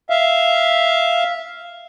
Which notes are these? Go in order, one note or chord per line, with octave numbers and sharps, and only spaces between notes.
E5 F5